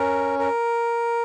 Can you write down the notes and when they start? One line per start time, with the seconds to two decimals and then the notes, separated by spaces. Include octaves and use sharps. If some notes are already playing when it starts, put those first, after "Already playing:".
Already playing: C#4 A#4
0.39 A#4